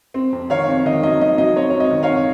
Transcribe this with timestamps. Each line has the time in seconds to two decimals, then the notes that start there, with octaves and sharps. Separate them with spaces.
0.14 C4
0.33 F2
0.50 D#3 C#5 F5
0.68 F2
0.86 D#3 D#5
1.03 F#3 D#5
1.21 F#3 D#5
1.38 F#3 D#5
1.56 C4 C#5
1.70 C4 C#5
1.80 D#5
1.91 D#3
2.03 C#5 F5
2.09 F2